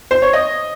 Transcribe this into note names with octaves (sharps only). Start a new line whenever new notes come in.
C5
C#5
D#5